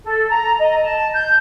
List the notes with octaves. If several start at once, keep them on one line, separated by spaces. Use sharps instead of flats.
A4
A#5
D#5
A5
G6